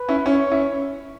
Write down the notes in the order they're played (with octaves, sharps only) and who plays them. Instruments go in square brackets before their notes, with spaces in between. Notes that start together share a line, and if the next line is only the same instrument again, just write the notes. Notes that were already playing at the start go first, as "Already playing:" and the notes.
Already playing: [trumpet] B4
[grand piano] C#4 E4
[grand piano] C#4 E4 [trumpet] C#5
[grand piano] C#4 E4